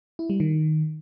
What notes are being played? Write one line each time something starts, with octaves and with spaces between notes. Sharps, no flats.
E4
G3
D#3